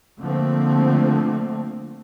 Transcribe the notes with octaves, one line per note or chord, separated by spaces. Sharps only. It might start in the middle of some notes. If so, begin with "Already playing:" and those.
D3 F3 A3 A#3 C4